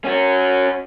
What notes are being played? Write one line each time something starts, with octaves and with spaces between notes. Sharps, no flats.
C#4 F#4